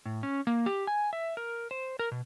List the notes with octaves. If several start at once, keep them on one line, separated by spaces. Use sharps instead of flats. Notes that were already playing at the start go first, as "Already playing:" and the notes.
A2
C#4
A#3
G4
G#5
E5
A#4
C5
A#4
B2